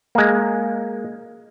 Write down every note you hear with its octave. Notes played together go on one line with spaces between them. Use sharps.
G#3 A#3